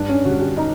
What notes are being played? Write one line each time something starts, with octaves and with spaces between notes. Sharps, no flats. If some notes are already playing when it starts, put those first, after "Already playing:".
Already playing: G2 D4
C#4
D3 G3 F#4
G4
D#4